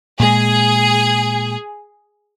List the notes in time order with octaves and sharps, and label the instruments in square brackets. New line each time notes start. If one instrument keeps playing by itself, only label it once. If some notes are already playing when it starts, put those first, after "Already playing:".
[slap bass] A#2 G#3 [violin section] G#4